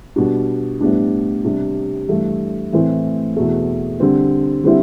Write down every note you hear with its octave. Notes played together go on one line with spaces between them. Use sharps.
B2 G3 D4
A2 G3 B3 D4
C3 G3 D4
G2 E3 A3
A2 E3 A3 C4 E4
E2 B2 A3
D3 G3 C4
D3 G3 C4 E4